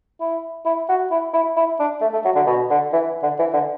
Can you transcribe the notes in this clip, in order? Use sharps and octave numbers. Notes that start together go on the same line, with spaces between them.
E4
E4
F#4
E4
E4
E4
D4
A3
A3
F#3
D3
B2
D3
E3
D3
E3
D3